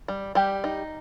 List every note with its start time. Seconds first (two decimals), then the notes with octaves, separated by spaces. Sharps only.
0.08 G3
0.35 G3 G4
0.64 D#4